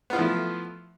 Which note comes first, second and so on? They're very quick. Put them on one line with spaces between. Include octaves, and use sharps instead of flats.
B3 F4 E4 F3 A3